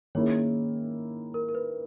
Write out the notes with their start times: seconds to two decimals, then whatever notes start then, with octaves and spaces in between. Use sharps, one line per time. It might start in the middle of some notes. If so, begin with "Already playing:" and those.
0.15 D#3 A#3 C#4 E4 G#4 C#5
1.34 A#4
1.49 A#4
1.55 B4